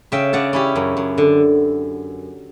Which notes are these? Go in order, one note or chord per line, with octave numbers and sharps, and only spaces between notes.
C#3 E5 G5
C#3 D5 F#5
C#4 E4 G4
F#2
F#2
D3